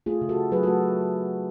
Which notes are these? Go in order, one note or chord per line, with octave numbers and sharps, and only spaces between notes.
A3 F4 G#4
C#3
F#4 A4
C#3
F#3 G#4 B4
F#4 A4
A3